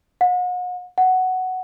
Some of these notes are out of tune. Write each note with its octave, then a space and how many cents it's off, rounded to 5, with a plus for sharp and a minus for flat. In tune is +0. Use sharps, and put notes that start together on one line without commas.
F#5 -40
F#5 +5